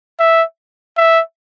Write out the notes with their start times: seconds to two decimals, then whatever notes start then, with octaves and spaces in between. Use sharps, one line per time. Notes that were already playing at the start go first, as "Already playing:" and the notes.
0.19 E5
0.97 E5